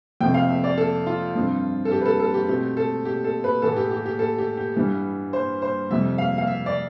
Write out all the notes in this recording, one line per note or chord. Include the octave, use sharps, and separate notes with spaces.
F2 C3 F3 A3 C4 G5
F5
E5
D5
A4
F4
G2 F3 C4
A4
G4
B4
A4
A4
G4
B2 A3 C4 G4
A4
G4
A4
B4
A2 E3 B3 A4
G4
G4
G4
A4
G4
G4
G2 E3 G3 B3
C5
C5
F2 C3 G3 E5
F5
F5
E5
D5